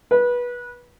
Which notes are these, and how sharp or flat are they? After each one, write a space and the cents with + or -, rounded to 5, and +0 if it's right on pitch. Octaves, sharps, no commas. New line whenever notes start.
B4 -20